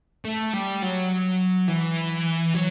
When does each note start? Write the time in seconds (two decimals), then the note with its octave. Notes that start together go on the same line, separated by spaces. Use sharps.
0.25 A3
0.53 G3
0.82 F#3
1.68 E3
2.54 F#3